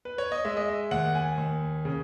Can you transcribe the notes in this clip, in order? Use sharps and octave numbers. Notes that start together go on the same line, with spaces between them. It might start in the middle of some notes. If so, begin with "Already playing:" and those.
B4
C#5
D#5
G#3 E5
D#5
E5
D#2 F#5
G#5
D#2
C#3